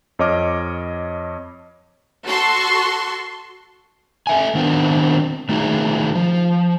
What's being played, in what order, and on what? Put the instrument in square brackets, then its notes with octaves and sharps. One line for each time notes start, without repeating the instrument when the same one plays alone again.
[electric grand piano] F2 C#5 D#5 D6 F6
[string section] F#4 A4 C6 C#6
[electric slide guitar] A4 E5 G#5
D#3 B3 C4 D4 A#4
D#3 A3 D#4 F#4 G#4
F3